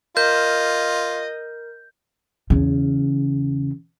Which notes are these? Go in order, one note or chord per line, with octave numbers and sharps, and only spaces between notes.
F4 A#4 D#5 G6
E2 C#3